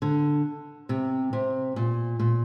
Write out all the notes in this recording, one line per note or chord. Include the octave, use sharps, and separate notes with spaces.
D3
C3
C3
A#2
A#2